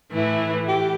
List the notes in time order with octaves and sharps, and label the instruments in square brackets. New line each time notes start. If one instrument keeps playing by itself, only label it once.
[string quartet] A2 E3 A3 E4
[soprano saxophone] G4